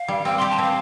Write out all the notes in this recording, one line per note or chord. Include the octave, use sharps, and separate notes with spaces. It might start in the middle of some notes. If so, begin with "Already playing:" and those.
Already playing: F5
G3
C4 G5
G4 C6
A5
C4 F5